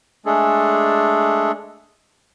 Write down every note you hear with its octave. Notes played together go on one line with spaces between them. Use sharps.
G#3 A3 D4 G#4 A4